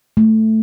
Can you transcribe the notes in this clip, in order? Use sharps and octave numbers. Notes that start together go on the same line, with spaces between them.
A3